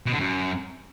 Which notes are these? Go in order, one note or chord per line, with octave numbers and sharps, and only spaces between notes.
B2
D3
F#2